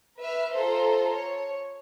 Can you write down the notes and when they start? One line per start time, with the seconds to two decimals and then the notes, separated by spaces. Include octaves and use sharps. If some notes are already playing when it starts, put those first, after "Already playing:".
0.18 B4 E5 F6
0.53 F4 A4 C5 A#5 C6
1.10 C#5